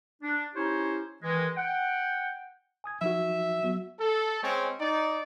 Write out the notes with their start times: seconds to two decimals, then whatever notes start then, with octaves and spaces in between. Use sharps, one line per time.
0.22 D4
0.54 C#4 D#4 E4 G4 C5 C#5
1.22 D#3 E3 G#3
1.57 F#5 G5
2.84 G#5 D#6 G#6
3.01 F3 D#4 F#4 E5
3.63 F#3 B3 F#4
4.00 A4
4.43 G#3 C4 C#4
4.81 D#4 D5